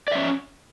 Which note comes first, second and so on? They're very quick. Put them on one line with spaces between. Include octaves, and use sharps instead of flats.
D5 E5 C#4